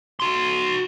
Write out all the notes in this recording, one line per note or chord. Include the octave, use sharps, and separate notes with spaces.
F#4 C6